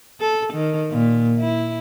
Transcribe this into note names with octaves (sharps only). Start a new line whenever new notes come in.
A4
D#3
A#2
E4